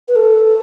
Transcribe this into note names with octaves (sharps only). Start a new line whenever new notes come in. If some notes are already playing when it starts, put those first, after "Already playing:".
B4
A4